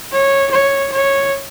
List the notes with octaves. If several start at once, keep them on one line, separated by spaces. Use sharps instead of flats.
C#5
C#5
C#5